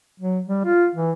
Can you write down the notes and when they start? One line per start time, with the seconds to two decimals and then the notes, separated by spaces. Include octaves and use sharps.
0.20 F#3
0.47 G3
0.65 F4
0.95 E3